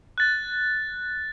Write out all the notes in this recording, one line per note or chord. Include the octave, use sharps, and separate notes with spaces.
F#6 A6